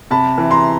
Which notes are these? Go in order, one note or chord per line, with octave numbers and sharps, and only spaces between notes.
C3 A5 B5
E3
A#5 C6